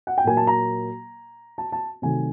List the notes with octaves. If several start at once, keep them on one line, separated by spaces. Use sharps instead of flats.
F#5
G5
A#2 F#3 A#3 G#5
A5
A#5
A5
A5
C3 D#3 F#3 A3 C4 G#5